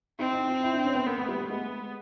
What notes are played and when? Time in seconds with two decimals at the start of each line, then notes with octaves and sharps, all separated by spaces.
0.19 C4 D#4
0.33 D#4
0.48 F4
0.62 E4
0.73 D4
0.85 C#4
0.95 B3
1.06 A#3 B3
1.17 A3
1.28 G3
1.39 A3
1.49 G#3 B3